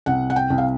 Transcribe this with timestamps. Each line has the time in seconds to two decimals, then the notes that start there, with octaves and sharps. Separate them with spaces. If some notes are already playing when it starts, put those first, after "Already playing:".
0.06 C2 F#5
0.30 F#5
0.36 G5
0.50 C2
0.58 F5